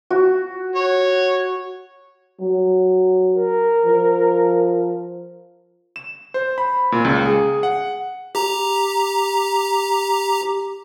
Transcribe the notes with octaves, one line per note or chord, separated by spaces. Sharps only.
F#4
C#5
F#3
A#4
F3
E7
C5
B5
A#2
C#2
G#4
F#5
G4 A#5